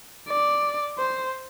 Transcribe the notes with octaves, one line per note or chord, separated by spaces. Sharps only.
D5
C5